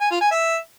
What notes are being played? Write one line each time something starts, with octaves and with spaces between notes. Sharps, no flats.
G#5
F4
G#5
E5